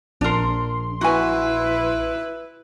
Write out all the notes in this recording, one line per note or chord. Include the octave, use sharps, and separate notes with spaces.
A#1 D4 A#4 C6
E4 F#4 B4 G#5